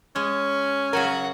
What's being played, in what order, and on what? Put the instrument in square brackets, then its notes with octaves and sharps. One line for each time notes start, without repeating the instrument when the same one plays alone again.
[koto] G#3 [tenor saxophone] C#4
[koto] C#3 F#3 G#5 [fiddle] F#4 F#5 [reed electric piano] A#4